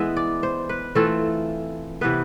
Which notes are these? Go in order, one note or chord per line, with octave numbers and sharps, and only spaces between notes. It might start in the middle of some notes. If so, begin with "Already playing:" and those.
Already playing: E3 G#3 B3 E5
D5
C5
B4
E3 A3 C4 F4 A4
C3 E3 B3 B4